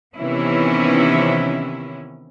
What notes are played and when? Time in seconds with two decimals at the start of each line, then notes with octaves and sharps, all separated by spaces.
0.16 C3 D#3 E3 B3 C#4 E4